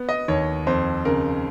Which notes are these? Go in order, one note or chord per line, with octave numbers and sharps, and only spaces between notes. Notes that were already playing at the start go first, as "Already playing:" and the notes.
Already playing: B3
D#5
D#2 C#5
F2 C5
C#3 A#4